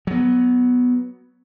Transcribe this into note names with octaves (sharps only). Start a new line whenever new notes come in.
F#3 B3